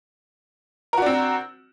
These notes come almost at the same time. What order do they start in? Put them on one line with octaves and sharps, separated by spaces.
A#4 F#4 D4 C4